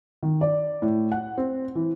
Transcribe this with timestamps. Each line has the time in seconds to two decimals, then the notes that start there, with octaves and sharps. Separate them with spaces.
0.23 D#3
0.41 D5
0.82 A2
1.12 F#5
1.38 C4
1.75 E3